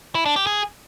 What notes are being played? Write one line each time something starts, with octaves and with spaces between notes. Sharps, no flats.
E4
D4
G4
G#4